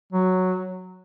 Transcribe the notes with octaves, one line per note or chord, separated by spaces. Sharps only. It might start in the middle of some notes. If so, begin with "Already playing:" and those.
F#3